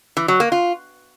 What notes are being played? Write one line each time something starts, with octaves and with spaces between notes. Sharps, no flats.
E3
F#3
A#3
F4